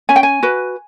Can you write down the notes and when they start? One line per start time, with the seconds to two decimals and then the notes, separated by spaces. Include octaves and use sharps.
0.09 C#4 G#5
0.16 G5
0.23 G#5
0.43 F#4 B4